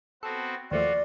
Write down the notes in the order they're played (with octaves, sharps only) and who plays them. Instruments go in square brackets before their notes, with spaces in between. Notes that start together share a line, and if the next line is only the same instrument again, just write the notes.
[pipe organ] B3 C4 F#4 [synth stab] A4
[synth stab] D#2 F3 A3 [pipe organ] F4 F#4 [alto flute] D5